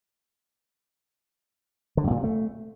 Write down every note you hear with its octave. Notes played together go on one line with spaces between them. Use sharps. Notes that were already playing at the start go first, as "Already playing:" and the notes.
D3
F#2
A#2
C3
A3